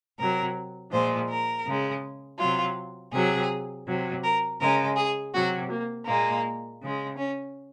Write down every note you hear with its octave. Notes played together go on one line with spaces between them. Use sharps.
C3 F#3 A#4
A#2 F3 G#3 C5
A#4
C#3 G#3
C3 F#3 F4
C3 F#3 G#4
C3 F#3
A#4
C#3 G#3 A#4
G#4
C3 F#3 F#4
A#3
A#2 G#3 A#3
C#3 G#3
C#4